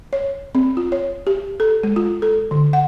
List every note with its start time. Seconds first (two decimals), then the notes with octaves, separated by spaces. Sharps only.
0.13 C#5
0.55 C4
0.77 F4
0.92 C#5
1.27 G4
1.60 A4
1.83 G#3
1.96 F4
2.22 A4
2.51 D3
2.73 F#5